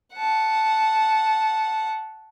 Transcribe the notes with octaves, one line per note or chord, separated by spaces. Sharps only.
F#5 A5